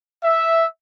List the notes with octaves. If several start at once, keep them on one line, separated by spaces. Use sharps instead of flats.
E5